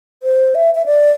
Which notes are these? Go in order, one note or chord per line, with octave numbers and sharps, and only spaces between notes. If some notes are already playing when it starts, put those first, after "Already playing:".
C5
E5
E5
D5